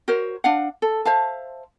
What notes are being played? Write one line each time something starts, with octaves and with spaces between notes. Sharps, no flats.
F#4 A#4 C5 C#5
D4 F5 F#5
A4
C5 E5 F5 A5